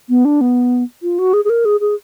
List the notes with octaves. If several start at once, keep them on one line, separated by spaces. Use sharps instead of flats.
B3
D4
B3
F4
F#4
G#4
G#4
A#4
G#4
G#4